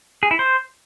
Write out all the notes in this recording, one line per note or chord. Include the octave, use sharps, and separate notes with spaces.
G#4
E4
C5